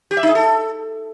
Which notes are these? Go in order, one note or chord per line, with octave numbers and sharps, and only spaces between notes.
G4
E5
D#4
G#4
A4